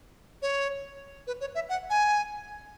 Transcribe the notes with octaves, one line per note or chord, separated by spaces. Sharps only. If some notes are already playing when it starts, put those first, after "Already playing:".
C#5
B4
C#5
E5
F#5
G#5